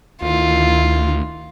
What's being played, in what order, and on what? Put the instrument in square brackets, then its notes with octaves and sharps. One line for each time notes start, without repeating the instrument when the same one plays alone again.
[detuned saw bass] D2 [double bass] D#3 E4 [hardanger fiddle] F4